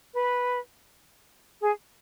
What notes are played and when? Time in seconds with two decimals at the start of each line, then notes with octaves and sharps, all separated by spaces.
0.14 B4
1.61 G#4